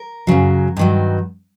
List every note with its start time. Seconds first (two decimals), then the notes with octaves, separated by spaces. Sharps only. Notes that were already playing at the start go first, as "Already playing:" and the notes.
Already playing: A#4
0.27 F#2 C#3 F#3
0.77 G2 D#3 F#3